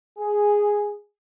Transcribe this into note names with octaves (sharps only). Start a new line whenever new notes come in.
G#4